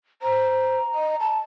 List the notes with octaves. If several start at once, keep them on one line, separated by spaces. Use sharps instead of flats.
C5 A#5
D#5
A5